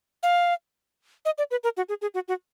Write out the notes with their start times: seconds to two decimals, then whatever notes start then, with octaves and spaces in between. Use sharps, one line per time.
0.23 F5
1.25 D#5
1.38 D5
1.51 B4
1.64 A#4
1.77 F#4
1.89 G#4
2.02 G#4
2.14 F#4
2.28 F#4